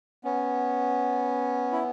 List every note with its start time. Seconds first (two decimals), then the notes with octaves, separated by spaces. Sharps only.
0.24 B3 C#4
1.72 E4